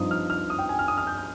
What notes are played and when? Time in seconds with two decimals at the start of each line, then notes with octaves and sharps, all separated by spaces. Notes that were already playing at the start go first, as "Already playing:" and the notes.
Already playing: G2 F3 C4 D#4 D#6
0.11 F6
0.30 F6
0.50 D#6
0.59 G5
0.69 G#5
0.79 F6
0.88 D#6
0.97 F6
1.07 G6
1.18 G6